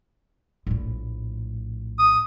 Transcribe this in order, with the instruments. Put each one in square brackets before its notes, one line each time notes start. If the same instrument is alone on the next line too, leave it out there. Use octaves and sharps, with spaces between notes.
[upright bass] A#1 A2
[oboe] D#6